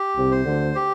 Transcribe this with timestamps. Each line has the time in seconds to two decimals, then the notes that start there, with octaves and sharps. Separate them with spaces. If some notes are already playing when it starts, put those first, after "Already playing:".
Already playing: G4
0.16 C2 C3
0.32 C5
0.46 D2 D3
0.75 G4